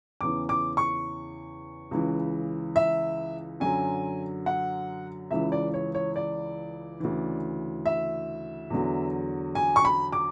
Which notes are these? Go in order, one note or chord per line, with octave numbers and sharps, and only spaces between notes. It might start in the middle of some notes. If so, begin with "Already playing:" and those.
E2 C#3 E3 D6
D6
C#6
C#2 C#3 E3
E5
F#2 D3 F#3 G#5
F#5
C#2 C#3 E3 E5
D5
C#5
C#5
D5
D2 C#3 E3
E5
E2 D3 F#3
G#5
C#6
B5
D6